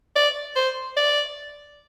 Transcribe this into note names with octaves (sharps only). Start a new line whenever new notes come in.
D5
C5
D5